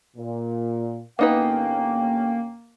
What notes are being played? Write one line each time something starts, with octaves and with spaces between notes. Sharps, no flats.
A#2
G1 A#3 B3 C#4 D#4 B4 G5